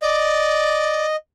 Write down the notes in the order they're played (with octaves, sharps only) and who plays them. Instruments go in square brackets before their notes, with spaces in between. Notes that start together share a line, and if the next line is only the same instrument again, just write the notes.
[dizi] D5 [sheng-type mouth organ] D#5